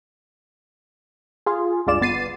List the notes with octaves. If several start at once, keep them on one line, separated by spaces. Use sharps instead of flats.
F4 G#4
C#2 G2 G#3 F4 D5 E7
G1 B3 A6 C7 D#7